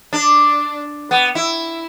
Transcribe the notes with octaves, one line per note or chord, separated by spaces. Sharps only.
D4
B3
E4